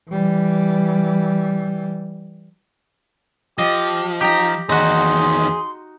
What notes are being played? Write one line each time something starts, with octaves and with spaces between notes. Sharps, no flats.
E3 G3
F3 G4 D#5
D#4 G4 A#5
E2 D#3 D#4 F#4 G#4 C6